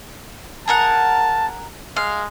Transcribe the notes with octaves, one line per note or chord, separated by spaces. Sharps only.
G#4 A#4 F#5 A5
G#3 F5